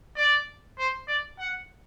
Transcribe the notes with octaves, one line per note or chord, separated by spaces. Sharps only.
D5
C5
D5
F#5